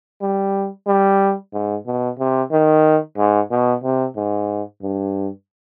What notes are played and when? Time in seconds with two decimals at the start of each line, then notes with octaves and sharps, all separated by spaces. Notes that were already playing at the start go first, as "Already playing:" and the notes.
0.22 G3
0.87 G3
1.53 G#2
1.86 B2
2.19 C3
2.52 D#3
3.18 G#2
3.51 B2
3.84 C3
4.16 G#2
4.82 G2